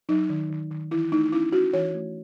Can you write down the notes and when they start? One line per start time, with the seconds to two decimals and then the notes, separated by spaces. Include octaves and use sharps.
0.09 F#3 D#4
0.29 D#3
0.50 D#3
0.71 D#3
0.91 E3 E4
1.12 A3 D#4
1.32 C#4 E4
1.53 C#4 F#4
1.73 E3 C#5
1.94 A3